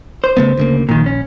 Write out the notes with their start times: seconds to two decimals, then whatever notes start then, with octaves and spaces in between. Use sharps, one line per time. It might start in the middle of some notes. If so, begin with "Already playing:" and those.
0.24 C5
0.37 C#3 A3 B3
0.57 D2 C#3 A#3
0.89 A#1 A#2 D#3
1.06 C#4